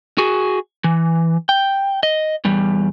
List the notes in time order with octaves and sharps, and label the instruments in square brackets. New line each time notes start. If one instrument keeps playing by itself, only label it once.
[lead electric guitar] F#4 G#4
E3
G5
D#5
E2 G3